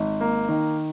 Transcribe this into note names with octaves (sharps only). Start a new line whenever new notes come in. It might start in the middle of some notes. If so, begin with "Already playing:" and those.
Already playing: G#1
A#3
D#3